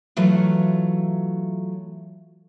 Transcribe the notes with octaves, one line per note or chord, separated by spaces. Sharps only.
E3 F#3 A3 F4